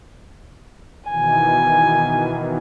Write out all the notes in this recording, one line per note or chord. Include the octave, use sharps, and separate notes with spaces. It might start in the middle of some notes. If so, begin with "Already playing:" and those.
B2 D#3 E3 G#5